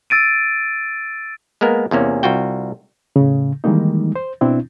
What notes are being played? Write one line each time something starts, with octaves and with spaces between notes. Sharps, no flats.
E6 A6 D7 D#7
G#3 A#3 B3 A#4
E2 C3 A#3 C#4
C2 F4 F#4 G5
A2 C#3
D#3 E3 G3 G#3 A#3 D#4
C5
B2 C4 D4 E4